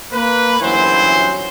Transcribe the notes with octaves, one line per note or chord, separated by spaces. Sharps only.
A#3 B4
G1 F#2 E3 F#3 C5